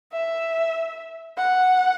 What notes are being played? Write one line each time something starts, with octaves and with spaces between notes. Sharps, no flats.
E5
F#5